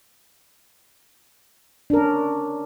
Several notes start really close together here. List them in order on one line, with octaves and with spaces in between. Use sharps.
D4 A#4 C#4